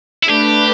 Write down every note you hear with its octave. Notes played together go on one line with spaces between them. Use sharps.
E4
A3 D4 G4 B4